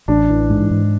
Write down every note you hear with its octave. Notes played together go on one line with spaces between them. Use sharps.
A1 D4
E3
G#2
G#2